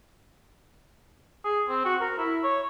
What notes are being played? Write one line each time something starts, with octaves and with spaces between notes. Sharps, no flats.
G#4
C4
F#4
A#4
E4
C#5